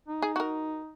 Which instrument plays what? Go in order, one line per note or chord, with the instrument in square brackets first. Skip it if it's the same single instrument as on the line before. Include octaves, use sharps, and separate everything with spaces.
[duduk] D#4
[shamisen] G#4
F#4 A#4